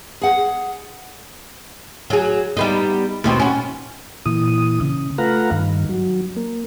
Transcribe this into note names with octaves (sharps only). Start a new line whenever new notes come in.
G#4 F#5
F#3 G#4
G3 B3 D#4
D#2 B2 C4
C#4 F#4
A#2 E3 D#6
C#3
A3 F4 B4 F5 F#5 A#5
G2 D#3
F#3
A#3